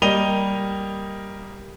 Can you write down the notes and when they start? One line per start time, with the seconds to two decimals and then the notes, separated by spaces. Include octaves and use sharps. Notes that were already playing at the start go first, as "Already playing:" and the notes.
0.02 G3 A#3 D#5 D#7 F7 G7